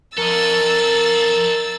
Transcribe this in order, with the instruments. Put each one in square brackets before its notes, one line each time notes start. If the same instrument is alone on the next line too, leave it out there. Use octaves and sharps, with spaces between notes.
[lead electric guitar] F2 [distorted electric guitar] A4 D#5 [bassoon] A#4 [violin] E6 A6